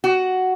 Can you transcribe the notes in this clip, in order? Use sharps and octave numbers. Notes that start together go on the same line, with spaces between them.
F#4